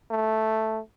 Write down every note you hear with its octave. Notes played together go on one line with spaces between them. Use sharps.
A3